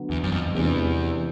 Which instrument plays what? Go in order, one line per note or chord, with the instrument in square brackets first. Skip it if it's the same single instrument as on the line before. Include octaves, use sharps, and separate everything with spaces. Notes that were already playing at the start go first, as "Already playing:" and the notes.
Already playing: [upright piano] D3 F#3 B3
[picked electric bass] E2
F#2
F2
[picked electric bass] E2 [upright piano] C3 E3 G#3 B3 D4